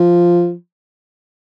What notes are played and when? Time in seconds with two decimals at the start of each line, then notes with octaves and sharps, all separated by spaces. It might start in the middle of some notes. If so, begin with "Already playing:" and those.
Already playing: F3